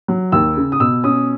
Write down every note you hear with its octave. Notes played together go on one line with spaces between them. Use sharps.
F#3
D#2 E6
C#3
D#6
B2 E6
C#4 D#6